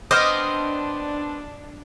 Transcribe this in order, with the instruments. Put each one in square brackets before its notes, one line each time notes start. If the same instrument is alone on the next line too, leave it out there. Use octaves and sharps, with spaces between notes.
[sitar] B3 C4 C5 [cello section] D4 [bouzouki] D#5 [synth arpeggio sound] D6 F6